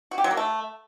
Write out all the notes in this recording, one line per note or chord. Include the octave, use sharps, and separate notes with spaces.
F#4
G4
F#3
A#3
A3